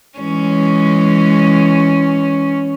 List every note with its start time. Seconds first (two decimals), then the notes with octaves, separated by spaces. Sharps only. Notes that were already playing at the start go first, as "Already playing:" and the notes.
0.20 E3 G#3 C#4